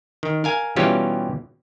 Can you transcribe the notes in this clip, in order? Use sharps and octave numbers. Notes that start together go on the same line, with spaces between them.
D#3
A#4 F5 G#5
B2 E3 G3 C#4 F4 G4